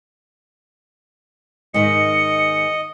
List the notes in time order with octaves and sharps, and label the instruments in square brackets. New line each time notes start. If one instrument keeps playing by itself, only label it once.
[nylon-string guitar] G#2 D#3 [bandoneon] D#5 [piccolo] C#7